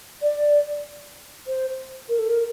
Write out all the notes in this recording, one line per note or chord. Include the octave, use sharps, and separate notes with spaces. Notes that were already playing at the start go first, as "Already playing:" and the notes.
D5
C5
A#4
A4
A#4